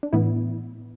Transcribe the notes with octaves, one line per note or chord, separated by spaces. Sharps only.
D4
A2 E3 B3 E4